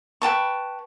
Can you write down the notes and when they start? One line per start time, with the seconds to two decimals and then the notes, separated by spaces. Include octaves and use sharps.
0.22 B4 G5 A5 C#6